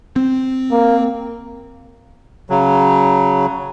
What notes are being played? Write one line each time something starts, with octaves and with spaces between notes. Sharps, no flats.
C4
A#3
C#3 F#3